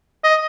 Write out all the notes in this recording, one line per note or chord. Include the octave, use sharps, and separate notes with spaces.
D#5